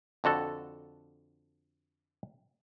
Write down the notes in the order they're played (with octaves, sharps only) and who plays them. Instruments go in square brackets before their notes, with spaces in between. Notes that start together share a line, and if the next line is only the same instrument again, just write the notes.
[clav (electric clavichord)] F2 D3 F#4 A4